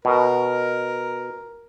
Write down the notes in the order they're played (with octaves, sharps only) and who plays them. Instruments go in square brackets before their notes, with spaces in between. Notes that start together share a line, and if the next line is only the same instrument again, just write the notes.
[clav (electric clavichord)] B2 [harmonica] A#4